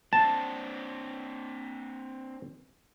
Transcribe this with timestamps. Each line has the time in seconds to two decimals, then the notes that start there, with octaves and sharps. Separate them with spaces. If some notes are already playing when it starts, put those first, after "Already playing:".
0.13 C4 D4 A5